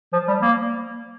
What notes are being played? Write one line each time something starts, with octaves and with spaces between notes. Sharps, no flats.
F3
G3
A#3